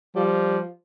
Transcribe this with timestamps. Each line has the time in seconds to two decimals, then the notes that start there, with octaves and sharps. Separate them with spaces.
0.16 F3 G3